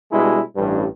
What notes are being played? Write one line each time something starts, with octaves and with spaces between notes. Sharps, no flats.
B2 G3 G#3 D4 E4
A1 G2